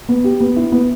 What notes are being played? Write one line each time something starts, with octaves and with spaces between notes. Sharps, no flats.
B3
G4
B3
E4
B3